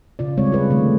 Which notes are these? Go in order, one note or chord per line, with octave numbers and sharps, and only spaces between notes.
C#3 F4 D5
G3 G#3 C4 C#5
F4 G#4 B4
D3 D#3 A3 C4